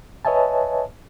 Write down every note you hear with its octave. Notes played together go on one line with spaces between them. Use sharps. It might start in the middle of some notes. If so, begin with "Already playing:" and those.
B4 C#5 D#5 E5 G#5 A5